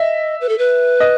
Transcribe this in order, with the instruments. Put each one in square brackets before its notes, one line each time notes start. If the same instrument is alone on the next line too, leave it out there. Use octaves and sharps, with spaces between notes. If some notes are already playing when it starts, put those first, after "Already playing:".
Already playing: [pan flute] D#5 [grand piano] E5
[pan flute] B4
A4
B4
[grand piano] D#5